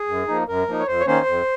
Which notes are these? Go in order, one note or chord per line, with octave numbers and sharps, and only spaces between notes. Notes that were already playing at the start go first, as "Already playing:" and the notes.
Already playing: G#4
F#2
F3 A#3 D#4
F#2 A#4
F3 A#3 D#4
C#5
F2 C5
C#5
D#3 A#3 C#4 C5
F2